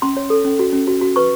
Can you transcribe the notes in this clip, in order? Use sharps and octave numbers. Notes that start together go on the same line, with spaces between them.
C#4 C6
C#5
A4
C#4
F#4
C#4
F#4
F#4
B4 C#6